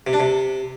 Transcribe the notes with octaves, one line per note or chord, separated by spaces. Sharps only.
C3
D4
C3